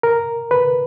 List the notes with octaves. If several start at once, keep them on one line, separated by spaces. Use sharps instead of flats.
A#4
B4